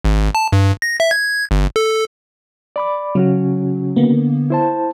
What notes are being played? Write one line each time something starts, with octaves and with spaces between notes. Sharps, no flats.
G#1
A5
G2
A#6
E5
G#6
G1
A4
D5 B5 D6
C#3 F#3 C#4 F#4
D3 A#3 B3
E4 C5 A5